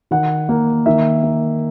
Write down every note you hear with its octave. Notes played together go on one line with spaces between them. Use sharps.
D#3 F#5
A#3
D#3 E5
A#3